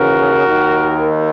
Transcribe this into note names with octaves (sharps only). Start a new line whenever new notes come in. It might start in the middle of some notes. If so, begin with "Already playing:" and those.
Already playing: D#2 C#3 E3 F#4 A#4
D#2 D#3